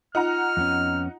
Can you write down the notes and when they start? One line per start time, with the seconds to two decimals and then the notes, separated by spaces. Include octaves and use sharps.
0.15 D#4 F4 F#5 A#5 F6
0.57 F2 B3 C#4